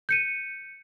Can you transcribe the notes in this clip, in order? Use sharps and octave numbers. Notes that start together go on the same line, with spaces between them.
G6 C#7 D#7